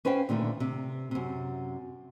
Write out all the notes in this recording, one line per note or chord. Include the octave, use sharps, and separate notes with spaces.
C#4 B4 C5 F5 G5
A#2 D3 D#3 A3
C3
F#2 C3